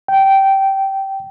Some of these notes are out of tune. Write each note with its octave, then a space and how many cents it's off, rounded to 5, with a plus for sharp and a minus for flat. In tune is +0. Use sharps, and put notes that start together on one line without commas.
G5 -15